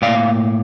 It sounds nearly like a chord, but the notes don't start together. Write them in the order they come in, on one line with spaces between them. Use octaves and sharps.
A2 F3 D5 F5 A#3